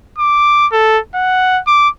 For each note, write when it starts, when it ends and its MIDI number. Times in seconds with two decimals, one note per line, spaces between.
0.19 0.67 86
0.72 0.99 69
1.15 1.60 78
1.67 1.89 86